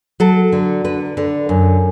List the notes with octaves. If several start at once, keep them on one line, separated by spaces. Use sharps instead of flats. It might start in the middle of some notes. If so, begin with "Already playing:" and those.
F#3 A4
D3
D3 B4
D3
F#2